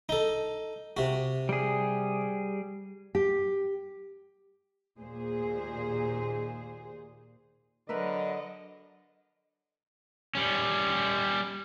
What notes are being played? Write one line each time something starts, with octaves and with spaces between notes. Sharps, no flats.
D#4 A4
C3 F#4
G3 G#4
G4
D#2 A#2 G#4 C5
D3 F#3 A#4 B4 D#5 E5
G3 C#4